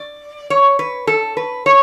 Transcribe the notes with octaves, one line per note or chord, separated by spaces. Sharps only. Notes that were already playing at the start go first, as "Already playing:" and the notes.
Already playing: D5
C#5
B4
A4
B4
C#5